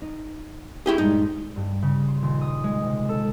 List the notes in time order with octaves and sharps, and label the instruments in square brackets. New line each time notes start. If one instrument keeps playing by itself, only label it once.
[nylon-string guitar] D#4
[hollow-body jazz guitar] E4 G4 G#4
[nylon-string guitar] G2 A#2 G#3 [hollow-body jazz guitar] D#4
[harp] G2
C#3
C6
D#1
D#6
G#3
C3
A4